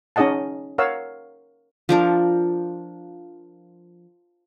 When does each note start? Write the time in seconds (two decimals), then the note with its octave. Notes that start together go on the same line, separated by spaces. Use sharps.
0.16 C#4 D#4 G#4 D#5 F#5 A5
0.78 A#4 C#5 F5 F#5 E6
1.89 F3 D4 A#4